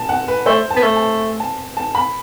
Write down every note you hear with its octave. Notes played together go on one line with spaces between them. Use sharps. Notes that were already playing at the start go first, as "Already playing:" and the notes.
Already playing: A5
F#5
B4
A3 C5
A5
B3
A3
A5
A5
A5
B5